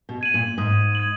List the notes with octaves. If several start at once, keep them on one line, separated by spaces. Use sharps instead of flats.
B2
G#6 D#7 F#7
A#2
G#2 D#6
G#6 D#7 F#7